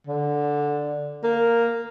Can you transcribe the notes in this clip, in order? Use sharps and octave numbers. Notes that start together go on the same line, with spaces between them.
D3
A#3